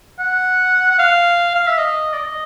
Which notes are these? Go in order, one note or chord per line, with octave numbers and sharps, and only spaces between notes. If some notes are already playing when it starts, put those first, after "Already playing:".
F#5
F#5
F5
F5
E5
D#5
D5
D#5